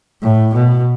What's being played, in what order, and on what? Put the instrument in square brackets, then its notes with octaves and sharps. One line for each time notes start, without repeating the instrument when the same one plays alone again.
[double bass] A2
B2